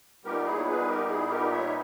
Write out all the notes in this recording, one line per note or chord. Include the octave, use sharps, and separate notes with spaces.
A#2 G3 B3 D#4 G4 A#4
E4 G#4
C#5
G#4 B4
G4 A#4
E4 G#4
G4 A#4
C#5 E5